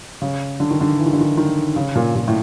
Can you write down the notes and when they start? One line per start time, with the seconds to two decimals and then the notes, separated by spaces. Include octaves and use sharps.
0.22 C#3
0.60 D3
0.71 D#3
0.81 D3
0.98 E3
1.06 D#3
1.13 D3
1.20 D#3
1.37 D#3
1.76 C#3
1.95 A#2
2.15 A#2
2.28 A2